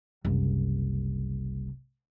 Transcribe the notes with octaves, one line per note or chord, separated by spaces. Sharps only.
F#1 C2